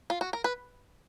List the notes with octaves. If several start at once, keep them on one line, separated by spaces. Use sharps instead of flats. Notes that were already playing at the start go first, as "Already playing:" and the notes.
F4
F#4
A#4
B4